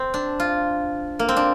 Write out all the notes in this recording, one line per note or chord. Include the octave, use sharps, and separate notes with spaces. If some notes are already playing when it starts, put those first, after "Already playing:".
Already playing: C4
D4
F4
A#3
C4
D4